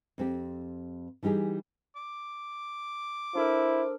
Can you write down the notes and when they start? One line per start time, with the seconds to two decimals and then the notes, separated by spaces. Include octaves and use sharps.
0.18 F2 C4 G4
1.23 E3 G3 D#4 G4 G#4
1.96 D6
3.35 D4 E4 A4 A#4 C5